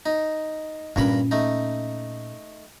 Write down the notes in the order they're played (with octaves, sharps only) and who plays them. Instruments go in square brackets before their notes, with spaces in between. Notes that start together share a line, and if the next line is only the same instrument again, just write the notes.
[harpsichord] D#4
[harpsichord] G2 A#4 B5 [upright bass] A#2 C#4
[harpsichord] A3 D#4